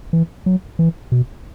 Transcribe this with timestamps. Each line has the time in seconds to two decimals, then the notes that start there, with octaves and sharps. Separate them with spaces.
0.13 E3
0.46 F#3
0.79 E3
1.12 B2